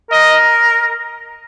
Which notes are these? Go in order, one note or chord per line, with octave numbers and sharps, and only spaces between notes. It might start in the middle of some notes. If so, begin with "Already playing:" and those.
A#4 D#5